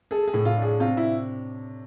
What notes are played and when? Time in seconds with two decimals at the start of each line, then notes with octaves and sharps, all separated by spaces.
0.11 G#4 A4
0.28 G#4
0.34 A2
0.45 F4
0.57 D4
0.62 G#4
0.80 C3 F4
0.97 E4